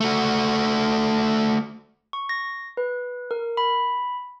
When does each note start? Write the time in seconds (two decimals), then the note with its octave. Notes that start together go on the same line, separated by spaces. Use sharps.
0.01 A3 F#4
2.13 C#6
2.29 A#6
2.77 B4
3.31 A#4
3.57 B5